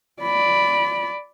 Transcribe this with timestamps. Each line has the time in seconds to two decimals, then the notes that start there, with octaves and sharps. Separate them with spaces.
0.22 D5 B5